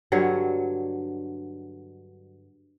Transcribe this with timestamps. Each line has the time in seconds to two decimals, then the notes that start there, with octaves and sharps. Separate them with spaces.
0.12 G2 D3 F#3 C#5